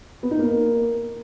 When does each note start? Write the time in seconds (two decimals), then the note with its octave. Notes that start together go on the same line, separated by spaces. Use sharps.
0.23 B3
0.31 D#4
0.39 A#3